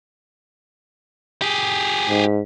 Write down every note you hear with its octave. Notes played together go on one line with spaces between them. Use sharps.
G4 G#4
G#2